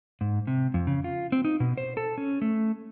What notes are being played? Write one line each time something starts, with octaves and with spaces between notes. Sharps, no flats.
G#2
C3
F2
C#3
F4
C4
D#4
B2
C5
A4
C#4
A3